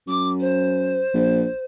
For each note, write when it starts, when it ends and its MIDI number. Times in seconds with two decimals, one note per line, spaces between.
0.08 1.02 42
0.08 0.27 86
0.40 1.65 72
1.14 1.45 34